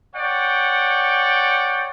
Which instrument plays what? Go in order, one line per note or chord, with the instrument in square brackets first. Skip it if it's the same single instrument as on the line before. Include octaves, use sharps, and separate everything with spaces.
[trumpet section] C#5 D5 F#5 G5